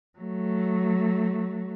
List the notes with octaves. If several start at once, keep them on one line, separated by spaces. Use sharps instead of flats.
F#3 A3